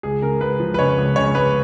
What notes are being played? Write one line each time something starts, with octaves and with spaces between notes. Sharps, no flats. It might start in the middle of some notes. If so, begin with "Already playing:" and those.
C#2 G#4
C#3 A#4
C#2 B4
F3
B4
C#3 C#5
C#2
C#3 C#5
C#2 B4